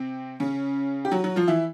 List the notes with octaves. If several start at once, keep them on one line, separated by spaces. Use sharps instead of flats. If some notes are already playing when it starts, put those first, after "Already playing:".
Already playing: C3 C4
C#3 C#4
G4
F#3 F#4
F#3 F#4
F3 F4
E3 E4